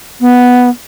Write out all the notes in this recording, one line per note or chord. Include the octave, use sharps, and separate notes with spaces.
B3